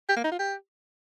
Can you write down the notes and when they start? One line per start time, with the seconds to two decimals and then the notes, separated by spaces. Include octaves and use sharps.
0.09 G4
0.16 A#3
0.24 D#4
0.31 F4
0.39 G4